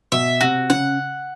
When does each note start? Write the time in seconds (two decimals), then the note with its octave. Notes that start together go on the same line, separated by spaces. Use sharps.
0.12 B2 E5
0.41 C3 F#4
0.70 C#3 F#5